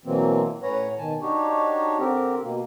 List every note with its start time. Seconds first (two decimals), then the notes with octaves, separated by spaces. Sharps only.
0.05 B2 E3 F#3 A#3 C4
0.62 A2 C#4 B4 C#5 F#5 A#5
0.98 B2 D#3 G#5 A5
1.21 D4 D#4 F#4 G4 C#5
1.99 D3 C4 G4 A#4
2.43 B2 A#3